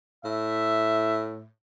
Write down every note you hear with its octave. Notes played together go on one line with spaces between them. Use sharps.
A2 E5